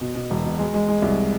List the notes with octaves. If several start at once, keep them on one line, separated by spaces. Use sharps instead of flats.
B2
B2
E1
B2
G#3
G#3
G#3
C2